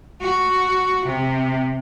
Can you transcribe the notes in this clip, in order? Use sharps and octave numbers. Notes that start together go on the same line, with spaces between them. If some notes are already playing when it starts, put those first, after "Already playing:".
F#4
C3